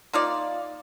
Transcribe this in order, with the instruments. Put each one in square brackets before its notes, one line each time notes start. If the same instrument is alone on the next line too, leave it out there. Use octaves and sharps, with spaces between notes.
[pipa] A#3 D#4 F4 D5